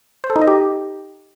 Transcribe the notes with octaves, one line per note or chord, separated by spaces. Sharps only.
C5
A4
D#4
D#5
G4